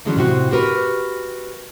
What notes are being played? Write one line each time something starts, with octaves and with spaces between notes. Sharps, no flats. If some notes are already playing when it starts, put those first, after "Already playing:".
D3 E3 F#3 G#3 A3 C#4
A2 C3 C4 F#4
F#4 G4 A#4 B4